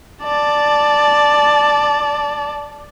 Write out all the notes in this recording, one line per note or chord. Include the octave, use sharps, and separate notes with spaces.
D5 A5